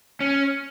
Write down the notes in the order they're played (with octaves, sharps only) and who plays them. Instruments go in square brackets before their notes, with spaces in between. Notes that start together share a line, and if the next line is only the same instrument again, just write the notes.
[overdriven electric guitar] C#4